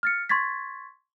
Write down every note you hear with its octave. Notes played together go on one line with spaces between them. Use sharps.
F6 A6 C#7
C6 C#6 G#6 A6 B6